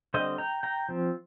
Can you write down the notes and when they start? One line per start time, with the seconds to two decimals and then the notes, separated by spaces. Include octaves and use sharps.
0.14 D3 G3 C4 C5 D#5
0.38 G5 A#5
0.63 G5 A#5
0.89 F3 C4